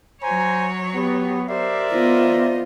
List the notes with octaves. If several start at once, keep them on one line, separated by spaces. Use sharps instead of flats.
F#3 C5 C#5 G#5 A#5
B3 G4
G4 A#4 C5 D5 E5
B3 F4 C5 D#5